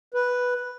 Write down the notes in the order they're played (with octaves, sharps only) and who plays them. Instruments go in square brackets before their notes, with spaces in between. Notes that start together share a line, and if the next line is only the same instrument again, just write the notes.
[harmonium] B4